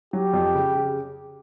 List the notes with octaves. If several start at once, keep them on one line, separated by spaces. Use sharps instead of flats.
F#3 G4
F2
C#3
C#3